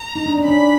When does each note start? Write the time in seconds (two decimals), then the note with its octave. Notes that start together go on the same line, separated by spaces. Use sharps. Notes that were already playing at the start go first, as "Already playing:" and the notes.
Already playing: A#5
0.15 D#4
0.26 D4
0.38 C#4
0.44 D4 B5